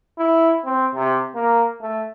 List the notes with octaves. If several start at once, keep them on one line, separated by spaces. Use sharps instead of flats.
E4
C4
C3
A#3
A3